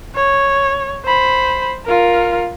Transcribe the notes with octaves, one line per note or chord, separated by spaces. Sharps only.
C#5
C5 B5
F4 A#4